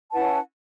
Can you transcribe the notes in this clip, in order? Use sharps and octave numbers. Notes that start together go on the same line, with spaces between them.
C#4 E4 B4 F#5 A5